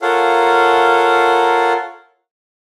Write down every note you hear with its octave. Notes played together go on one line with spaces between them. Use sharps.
F4 A4 A#4 C#5 F5 F#5